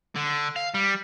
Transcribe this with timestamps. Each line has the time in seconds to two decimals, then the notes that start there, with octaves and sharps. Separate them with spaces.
0.16 D3
0.56 F5
0.74 G3